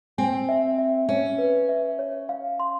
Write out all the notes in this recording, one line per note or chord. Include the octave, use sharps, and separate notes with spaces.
C4 G#5
E5
E5
C#4 E5
B4
E5
C#5
F5
C6